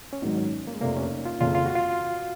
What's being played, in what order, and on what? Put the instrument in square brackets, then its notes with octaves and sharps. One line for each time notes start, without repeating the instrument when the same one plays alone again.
[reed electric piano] C#4
[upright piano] G#1 G#2 D#3 F#3 [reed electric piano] D#4
[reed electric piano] C#4
A#3
G#3
[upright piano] F1 F2 C3 [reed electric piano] A#3
[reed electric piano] C#4
D#4
F4
[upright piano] F#1 F2 C#3 [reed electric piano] F4
[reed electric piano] F4
F#4
F4